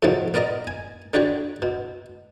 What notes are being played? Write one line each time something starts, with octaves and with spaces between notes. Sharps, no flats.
F2 G#2 C3 D#3 F3 F#3
B3 A#4 D5 D#5 A#5
G#5
D3 D4 F#4 G4 C#5
B2